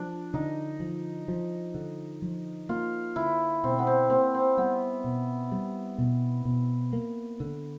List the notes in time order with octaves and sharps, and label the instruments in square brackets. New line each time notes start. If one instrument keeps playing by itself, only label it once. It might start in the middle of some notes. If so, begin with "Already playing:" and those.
Already playing: [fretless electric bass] F3 [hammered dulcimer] D4
[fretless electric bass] D3 [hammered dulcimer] D#4
[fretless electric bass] F3
F3
D3
F3
[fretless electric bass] A#3 [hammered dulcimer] F4
[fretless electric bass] D3 [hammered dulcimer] E4
[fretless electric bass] B2 [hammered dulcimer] C4
[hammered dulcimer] B3
C4
[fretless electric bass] A#3 [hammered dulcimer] C4
[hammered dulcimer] C4
[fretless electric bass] G3 [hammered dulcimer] B3
[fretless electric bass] B2
G3
B2
B2
A#3
D3